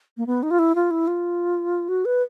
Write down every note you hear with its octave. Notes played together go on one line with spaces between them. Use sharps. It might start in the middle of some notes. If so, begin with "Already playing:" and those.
A#3
B3
D#4
F4
E4
F4
E4
F4
F#4
B4